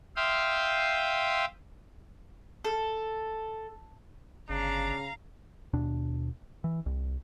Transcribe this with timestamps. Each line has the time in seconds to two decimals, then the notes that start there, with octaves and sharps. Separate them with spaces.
0.16 E5 F5 G5 C6 D#6
2.65 A4
4.49 G1 C#3 D4 F5 A#5
5.73 D#2 B2 D4
6.64 E3
6.86 C2